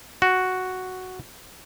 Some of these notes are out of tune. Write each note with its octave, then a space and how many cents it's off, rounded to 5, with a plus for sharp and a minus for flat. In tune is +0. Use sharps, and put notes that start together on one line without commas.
F#4 +0